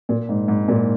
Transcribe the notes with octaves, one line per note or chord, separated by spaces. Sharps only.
A#2
G#2
G#2
A#2